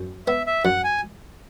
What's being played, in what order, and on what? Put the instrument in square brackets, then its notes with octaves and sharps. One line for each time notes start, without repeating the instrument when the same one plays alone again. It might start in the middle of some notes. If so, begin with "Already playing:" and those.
Already playing: [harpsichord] F#2
[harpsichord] B3 [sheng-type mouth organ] E5
[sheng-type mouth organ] E5
[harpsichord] F#2 [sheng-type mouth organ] F#5
[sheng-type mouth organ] G#5